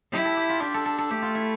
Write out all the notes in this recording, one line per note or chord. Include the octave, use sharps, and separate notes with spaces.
E4 G4
A4
G4
F4
D4 G4
A4
A4
A4
A3 G4
F4
E4